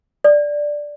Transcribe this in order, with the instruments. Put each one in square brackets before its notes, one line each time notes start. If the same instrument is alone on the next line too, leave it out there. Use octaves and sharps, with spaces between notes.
[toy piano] D5